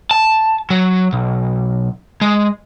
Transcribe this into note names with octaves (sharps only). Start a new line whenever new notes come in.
A5
F#3
B1
G#3